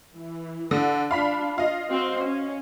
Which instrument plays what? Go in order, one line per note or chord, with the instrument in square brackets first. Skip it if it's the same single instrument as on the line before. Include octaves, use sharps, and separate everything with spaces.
[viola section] E3
[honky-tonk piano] D3
[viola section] D4 F4 [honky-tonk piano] F5 B5 B6
[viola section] F4 [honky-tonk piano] D#5 F5
[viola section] C4 F#4 C5
C#4